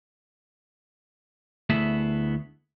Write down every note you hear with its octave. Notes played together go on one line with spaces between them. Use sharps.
D2 A3 B3 E4 G#4 E5